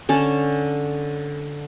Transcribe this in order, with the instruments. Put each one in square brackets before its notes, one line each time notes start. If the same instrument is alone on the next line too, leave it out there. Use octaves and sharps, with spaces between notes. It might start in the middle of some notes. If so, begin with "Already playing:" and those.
[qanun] D3 C#4 A5